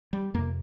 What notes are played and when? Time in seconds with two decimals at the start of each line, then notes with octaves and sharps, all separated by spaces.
0.13 G3
0.34 F2 C3 A#3